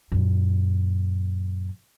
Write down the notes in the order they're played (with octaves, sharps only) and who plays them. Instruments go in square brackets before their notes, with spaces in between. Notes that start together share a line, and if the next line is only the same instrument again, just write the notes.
[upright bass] F#2 A#2